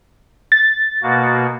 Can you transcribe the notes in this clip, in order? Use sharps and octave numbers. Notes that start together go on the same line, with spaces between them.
A6
B2 A#3 F#4